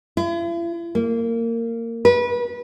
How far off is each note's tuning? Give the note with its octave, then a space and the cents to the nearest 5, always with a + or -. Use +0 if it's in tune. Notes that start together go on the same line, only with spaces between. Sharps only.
E4 +45
A#3 -20
B4 -25